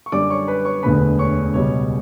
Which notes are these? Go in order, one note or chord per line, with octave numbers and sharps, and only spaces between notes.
C#6
F#2 D3 G3 D5 D6
C#5 C#6
B4 B5
C#5 C#6
E1 D2 D3 B4 B5
C#5 C#6
C#2 B2 G3 C#5 C#6